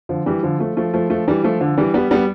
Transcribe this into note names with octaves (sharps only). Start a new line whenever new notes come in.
D3 F3
E3 G3
D3 F3
F3 A3
F3 A3
F3 A3
F3 A3
E3 G3
F3 A3
D3 F3
E3 G3
G3 B3
G3 B3